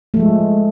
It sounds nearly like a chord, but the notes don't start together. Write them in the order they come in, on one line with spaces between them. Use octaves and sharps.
A3 F3 G#3